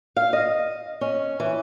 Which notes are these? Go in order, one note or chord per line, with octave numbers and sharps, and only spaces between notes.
F5
D#5
C#4
E3